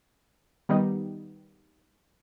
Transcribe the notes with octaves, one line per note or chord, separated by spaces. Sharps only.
D#3 G3 B3 D#4